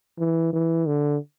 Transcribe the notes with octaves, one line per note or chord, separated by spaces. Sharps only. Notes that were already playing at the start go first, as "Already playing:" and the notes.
E3
E3
D3